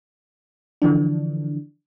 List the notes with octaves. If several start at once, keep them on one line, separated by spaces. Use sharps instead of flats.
D3 E3 F3 D4